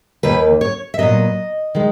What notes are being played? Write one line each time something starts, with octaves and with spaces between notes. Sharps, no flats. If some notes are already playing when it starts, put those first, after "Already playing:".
D#2 D#3 A#3 B4
C#5
E5
A#2 F#3 B3 D#5
D#3 G#3